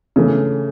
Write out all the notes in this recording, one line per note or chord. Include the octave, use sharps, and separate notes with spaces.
C#3 E3 A3